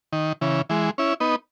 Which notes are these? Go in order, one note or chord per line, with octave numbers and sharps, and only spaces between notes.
D#3
C#3 E3
E3 G#3
C#4 E4
B3 D#4